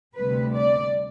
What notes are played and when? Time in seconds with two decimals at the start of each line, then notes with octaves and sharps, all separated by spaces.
0.16 D2 C3 G3 B4
0.55 D5